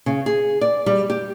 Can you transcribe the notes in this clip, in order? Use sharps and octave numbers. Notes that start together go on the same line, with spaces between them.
C#3
G#4
D5
G3
G4